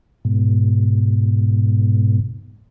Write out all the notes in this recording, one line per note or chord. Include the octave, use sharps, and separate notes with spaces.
G#2 B2